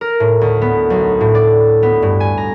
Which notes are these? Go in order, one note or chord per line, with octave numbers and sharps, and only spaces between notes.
A#4
A2
D2
B3
B1
A2
D5
B3
G2
G#5
A#5